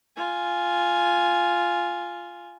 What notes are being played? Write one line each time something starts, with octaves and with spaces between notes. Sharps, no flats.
F4 G#5